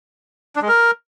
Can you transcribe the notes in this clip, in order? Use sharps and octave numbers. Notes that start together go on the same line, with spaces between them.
D4
G#3
A#4